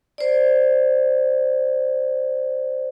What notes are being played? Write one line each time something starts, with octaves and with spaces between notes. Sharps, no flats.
C5 D5